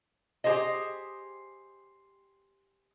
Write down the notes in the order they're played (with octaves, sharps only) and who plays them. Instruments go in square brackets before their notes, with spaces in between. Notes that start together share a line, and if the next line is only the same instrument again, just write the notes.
[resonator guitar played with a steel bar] G4 G#4 C5 D#5